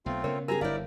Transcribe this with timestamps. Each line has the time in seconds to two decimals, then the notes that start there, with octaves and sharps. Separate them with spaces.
0.06 B1 A3 B3 C4 F4
0.24 C#3 B3 A#4 C#5
0.48 F4 G4 G#4 A#4 G#5 A#5
0.61 G1 D3 E4 A#4 C#5 D5 F5